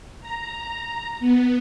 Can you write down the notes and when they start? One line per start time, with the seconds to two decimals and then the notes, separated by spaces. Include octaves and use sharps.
0.21 A#5
1.20 B3